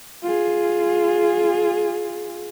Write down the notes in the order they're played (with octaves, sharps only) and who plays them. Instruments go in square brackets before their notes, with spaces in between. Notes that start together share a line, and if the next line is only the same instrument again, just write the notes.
[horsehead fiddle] F4 G#4